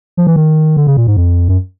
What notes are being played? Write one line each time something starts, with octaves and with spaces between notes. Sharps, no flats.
F3
E3
D#3
D3
C#3
A#2
G#2
F2
F#2